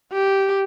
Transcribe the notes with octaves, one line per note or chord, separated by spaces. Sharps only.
G4